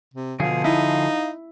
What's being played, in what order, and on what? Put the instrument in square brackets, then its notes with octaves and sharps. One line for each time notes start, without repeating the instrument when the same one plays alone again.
[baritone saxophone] C3
[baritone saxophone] B2 [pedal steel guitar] D3 F3 G#4 [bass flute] F5
[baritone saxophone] D#4 [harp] E4